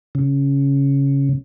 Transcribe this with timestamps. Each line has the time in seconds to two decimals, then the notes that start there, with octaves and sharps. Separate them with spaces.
0.15 C#3